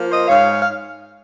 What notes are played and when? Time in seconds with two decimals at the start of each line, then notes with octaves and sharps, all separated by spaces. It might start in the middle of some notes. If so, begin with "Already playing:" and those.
Already playing: F3 A#3
0.09 C5 D#5
0.27 G#2 C#5 F5
0.58 F5